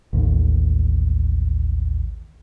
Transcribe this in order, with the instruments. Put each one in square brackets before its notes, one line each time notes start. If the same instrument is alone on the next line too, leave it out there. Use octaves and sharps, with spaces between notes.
[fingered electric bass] A1 D#2